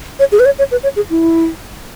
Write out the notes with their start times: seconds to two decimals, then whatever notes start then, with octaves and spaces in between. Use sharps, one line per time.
0.19 C#5
0.32 G#4
0.39 B4
0.45 C#5
0.58 C#5
0.71 B4
0.83 C#5
0.96 G#4
1.10 E4